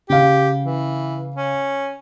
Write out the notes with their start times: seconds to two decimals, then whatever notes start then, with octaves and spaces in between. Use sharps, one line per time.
0.10 C#3 G4 F5
0.64 E3
1.36 C#4